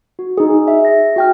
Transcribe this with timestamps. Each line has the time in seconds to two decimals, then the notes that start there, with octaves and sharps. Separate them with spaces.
0.19 F#4
0.38 D#4 G#4
0.68 E5
0.85 A#6
1.16 F#4 G5 F6